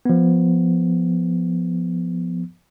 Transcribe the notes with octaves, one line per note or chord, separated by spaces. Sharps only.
F3 B3